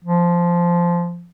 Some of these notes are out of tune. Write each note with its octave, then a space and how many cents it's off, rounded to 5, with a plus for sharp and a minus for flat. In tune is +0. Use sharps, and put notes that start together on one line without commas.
F3 -10